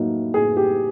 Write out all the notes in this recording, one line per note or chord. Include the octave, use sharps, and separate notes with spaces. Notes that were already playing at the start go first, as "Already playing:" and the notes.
Already playing: A2 F#3 A#3 D#4
A2 G#4
G4